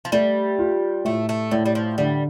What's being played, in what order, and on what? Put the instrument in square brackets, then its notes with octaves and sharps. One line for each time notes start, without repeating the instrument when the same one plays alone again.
[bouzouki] F3
[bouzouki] G3 [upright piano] A3
[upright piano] F4
[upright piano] A2 [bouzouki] A3
[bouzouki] A3
[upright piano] A2 [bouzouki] D3
[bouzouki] G3
F3
[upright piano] D3 [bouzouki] G3